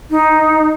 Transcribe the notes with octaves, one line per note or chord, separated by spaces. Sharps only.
D#4